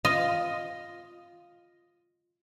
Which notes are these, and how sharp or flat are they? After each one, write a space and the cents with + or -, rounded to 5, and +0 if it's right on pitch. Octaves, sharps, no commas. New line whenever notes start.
F4 +0 D#5 +0